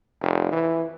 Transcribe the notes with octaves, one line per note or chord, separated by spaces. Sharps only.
F1
E3